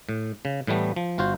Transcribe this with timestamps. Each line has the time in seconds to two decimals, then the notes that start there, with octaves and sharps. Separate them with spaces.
0.09 A2
0.45 C#3
0.67 A2 E3 G3 A3 B3
0.96 F3
1.18 G1 F4 F#4 C5